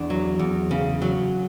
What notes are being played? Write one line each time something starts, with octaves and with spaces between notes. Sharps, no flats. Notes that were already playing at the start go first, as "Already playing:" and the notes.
Already playing: E2 D4
F#3
E2
C#3
F#3